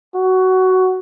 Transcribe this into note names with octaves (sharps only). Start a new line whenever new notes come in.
F#4